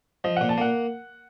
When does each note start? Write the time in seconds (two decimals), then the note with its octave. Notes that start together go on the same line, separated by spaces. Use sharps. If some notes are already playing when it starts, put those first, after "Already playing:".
0.24 F3 D#5
0.37 F#5
0.41 A#2
0.49 A5
0.58 A#3 F#5